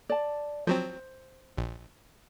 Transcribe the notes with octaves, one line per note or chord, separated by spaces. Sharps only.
D5 A5
F3 F#3 C4 C5
A#1